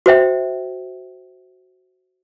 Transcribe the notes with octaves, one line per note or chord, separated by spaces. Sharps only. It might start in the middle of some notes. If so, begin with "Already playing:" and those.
F#4 C5 E5 G5